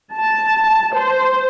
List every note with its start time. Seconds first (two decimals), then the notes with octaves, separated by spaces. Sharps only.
0.14 A5
0.96 C5